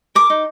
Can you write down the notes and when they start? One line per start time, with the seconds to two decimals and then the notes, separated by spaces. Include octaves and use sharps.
0.15 A#4 D6
0.30 D#4